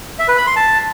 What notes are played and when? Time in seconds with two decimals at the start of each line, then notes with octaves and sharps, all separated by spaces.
0.19 E5
0.28 B4
0.38 B5
0.47 C6
0.56 A5